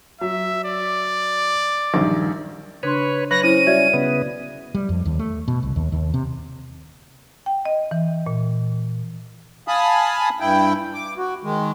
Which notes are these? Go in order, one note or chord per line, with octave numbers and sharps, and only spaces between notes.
F#3 E5
D5
A#1 G2 D#3
C#3 D4 B4 C#5 C6
F#3 B4 C#5 F#6 A#6
C#4 E4 C5 D#7
G3 F#4 C#5 D5 E5 G#6
C#3 B3
G3
F2
D#2
A3
B2
C2
D#2
D#2
C3
G5
D#5
E3
A#2
F5 G#5 A5 B5 D#6
G2 E4 G5
D6
F#4
D#3 G#3